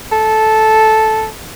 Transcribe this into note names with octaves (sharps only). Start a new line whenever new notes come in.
A4